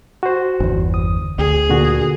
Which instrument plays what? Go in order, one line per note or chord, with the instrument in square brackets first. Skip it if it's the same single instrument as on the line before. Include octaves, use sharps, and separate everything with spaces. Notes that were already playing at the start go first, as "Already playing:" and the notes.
[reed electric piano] F#4 C5
[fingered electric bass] G1 E2
[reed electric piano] D#6
[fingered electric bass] D2 [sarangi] G#4
[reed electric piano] A#2 D3 F#4